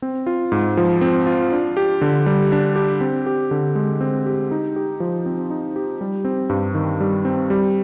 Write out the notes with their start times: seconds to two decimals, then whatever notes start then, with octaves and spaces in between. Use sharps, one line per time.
0.02 C4
0.26 F4
0.52 G#2
0.77 F3
1.01 C4
1.26 F4
1.52 D4
1.77 G4
2.01 D3
2.26 G3
2.52 D4
2.76 G4
3.01 C4
3.26 G4
3.51 D3
3.75 G#3
4.01 C4
4.26 G4
4.51 D#4
4.76 G4
5.00 F3
5.26 C4
5.50 D#4
5.76 G4
6.01 G3
6.25 C4
6.49 G2
6.74 D#3
7.00 G3
7.25 C4
7.50 G3